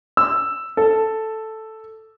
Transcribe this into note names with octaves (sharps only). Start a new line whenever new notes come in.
E6
A4